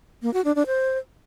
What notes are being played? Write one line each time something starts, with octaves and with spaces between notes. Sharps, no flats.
A#3
F#4
D4
D4
C5